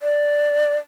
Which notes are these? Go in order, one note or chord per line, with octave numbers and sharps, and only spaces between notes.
D5